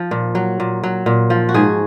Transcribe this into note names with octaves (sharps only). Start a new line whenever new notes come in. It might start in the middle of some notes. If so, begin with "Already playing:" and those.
Already playing: F3
A#2
F#3
A#2
F#3
A#2
F3
F#4
G#2 G#4